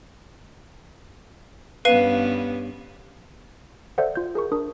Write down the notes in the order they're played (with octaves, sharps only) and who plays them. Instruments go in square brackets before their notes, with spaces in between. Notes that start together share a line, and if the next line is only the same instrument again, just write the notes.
[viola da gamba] G2 B3 C#4 [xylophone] B4 F5 D#7
[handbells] A4 C5 D5 E5 F#5
F4 G6
G#4 A#4 C#6
D4 A#4 D#6